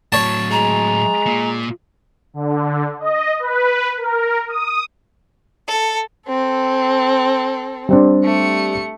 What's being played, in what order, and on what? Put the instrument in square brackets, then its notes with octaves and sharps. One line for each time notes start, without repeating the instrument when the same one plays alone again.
[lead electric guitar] A2 F#3 [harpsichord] C#5 A5
[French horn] G#3 [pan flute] A#5
[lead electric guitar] A#2
[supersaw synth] D3
D#5
B4
A#4
D#6
[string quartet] A4
[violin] C4 A4
[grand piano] G3 C4 D4
[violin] A3 C#7